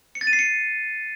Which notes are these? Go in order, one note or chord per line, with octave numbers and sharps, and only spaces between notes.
C#7
A6
D#7
C7
C#7